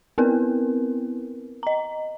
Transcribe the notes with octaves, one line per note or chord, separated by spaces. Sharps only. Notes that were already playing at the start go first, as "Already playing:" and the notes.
B3 C4 E4 A#4 B4
D#5 A#5